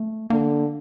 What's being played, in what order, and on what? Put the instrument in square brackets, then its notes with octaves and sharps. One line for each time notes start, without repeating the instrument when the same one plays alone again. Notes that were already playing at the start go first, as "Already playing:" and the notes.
Already playing: [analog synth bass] A3
[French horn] D3 [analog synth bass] A#3